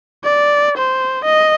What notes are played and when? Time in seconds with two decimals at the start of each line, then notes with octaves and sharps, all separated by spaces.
0.24 D5
0.77 C5
1.25 D#5